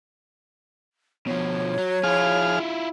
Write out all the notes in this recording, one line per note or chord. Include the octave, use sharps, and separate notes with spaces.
B2 F3 C#5
F#3
F3 E4 F4 G#4 F6